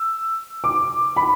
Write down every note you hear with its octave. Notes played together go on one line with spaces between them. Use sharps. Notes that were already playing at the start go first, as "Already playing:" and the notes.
Already playing: E6
D6
B5